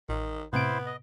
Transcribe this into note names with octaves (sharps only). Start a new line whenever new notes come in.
A1 D#3
A2 C3 B3 E4 C5 D7
D#5